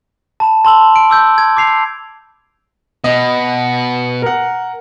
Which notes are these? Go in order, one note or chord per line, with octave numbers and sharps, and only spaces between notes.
A5 B5 E7
A5 C6 E6 F#7
D7
D6 E6 G6
G#6
D6 G#6 C7 F7
B2 D#5
A#4 F#5